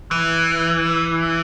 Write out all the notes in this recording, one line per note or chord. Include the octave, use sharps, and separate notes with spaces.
E3